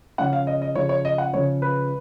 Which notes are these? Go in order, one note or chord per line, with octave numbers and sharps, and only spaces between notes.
C#3 F3 G#3 C#4 F#5
F5
D#5
D#5
C#3 F3 G#3 C#4 C#5
C#5
D#5
F#5
C#3 F3 G#3 C#4 C#5
B4